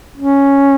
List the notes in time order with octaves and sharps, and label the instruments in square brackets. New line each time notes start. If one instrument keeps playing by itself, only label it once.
[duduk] C#4